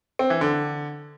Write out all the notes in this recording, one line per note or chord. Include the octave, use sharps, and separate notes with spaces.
C4
E3
D3